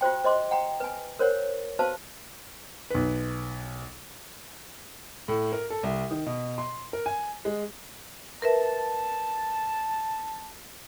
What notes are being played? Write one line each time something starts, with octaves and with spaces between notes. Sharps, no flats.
F4 F#4 C5 G5
C5 D#5 C6 D6
F#5 G5 A#5
B4 G#5
A#4 C5 C#5 F#5
F#4 B4 C5 F5 A5
B1 B4
A2
A#4
A4
C2
D#3
B2
C6
A#4
G#5
G#3
A#4 B4 E5 A5